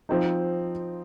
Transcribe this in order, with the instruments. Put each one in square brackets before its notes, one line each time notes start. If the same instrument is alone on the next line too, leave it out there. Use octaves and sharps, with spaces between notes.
[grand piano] F3 C4 D#4